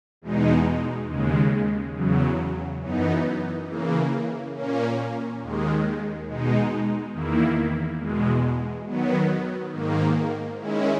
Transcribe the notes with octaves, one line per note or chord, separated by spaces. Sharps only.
E2 B2 G#3 D#4
D#2 C#3 G#3
E2 C#3 F#3
F#2 E3 B3 D#4
C#3 E3 A#3
A#2 A#3 C#4
D#2 D#3 G#3
B2 G#3 D#4
E2 D#3 A#3 E4
E2 B2 G#3
D#3 F#3 B3
G#2 D#3 A#3
D#3 G#3 C#4 E4